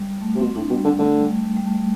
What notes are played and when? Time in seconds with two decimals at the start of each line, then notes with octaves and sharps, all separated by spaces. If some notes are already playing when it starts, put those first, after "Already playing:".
Already playing: G3
0.21 A3
0.35 C3
0.40 B2 C4
0.55 A2 D4
0.70 B2 G3
0.84 D3
0.98 D3 A3
1.19 G3
1.28 A3
1.57 G3
1.66 A3
1.74 G3